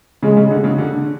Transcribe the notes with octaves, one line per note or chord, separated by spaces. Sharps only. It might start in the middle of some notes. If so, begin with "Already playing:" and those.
C#3 G#3
C#3
D3
C#3
D3